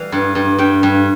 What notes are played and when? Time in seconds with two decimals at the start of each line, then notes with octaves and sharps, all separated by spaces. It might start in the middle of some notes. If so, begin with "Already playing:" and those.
Already playing: E3 G3 F5
0.12 G2
0.35 G2
0.58 G2 G5
0.83 G2